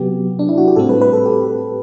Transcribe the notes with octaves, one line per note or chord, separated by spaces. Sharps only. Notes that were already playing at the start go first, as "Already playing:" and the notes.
Already playing: C3 F#3 B3 G4
D4
E4
F#4
G4
A2 G3 C4 A4
B4
B4
A4
G4